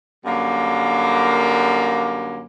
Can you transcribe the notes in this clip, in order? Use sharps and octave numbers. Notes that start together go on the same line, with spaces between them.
F#2 D3 G3 A#3